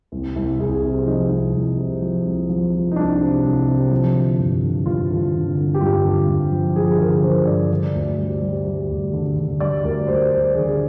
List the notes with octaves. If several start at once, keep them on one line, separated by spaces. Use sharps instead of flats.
C2
C2
C2 G#4
C3
F3 D#4
C2
C2
C3
F3
C2
F3
F3
D#4
C2 D4
C3
C2
C3
F3
D3
G2
D3
G2 F4
D3
D3
D3
G4
G2 F4
D3
G2
F3
F3 G#4
D3 A#4
F3 C5
G2 D5
D3
D2
G3
G3
G3
D2
D3
D3
G3 D5
D2 A#4
G3 C5
G3 C5
D3 G#4